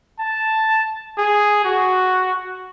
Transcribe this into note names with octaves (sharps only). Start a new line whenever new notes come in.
A5
G#4
F#4